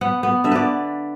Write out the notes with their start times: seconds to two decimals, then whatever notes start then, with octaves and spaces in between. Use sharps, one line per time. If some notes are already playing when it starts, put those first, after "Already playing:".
0.01 B3 F#5
0.23 B3
0.44 D3 E5
0.52 B4 D5